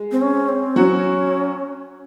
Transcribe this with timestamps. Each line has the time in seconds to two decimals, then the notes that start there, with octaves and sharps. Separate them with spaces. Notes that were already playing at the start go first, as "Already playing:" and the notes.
Already playing: G#3
0.12 C4
0.21 C#4
0.49 C4
0.76 F#3 C#4 F#4